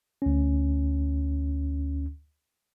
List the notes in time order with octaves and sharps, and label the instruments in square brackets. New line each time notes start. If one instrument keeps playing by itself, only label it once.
[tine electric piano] D2 C#4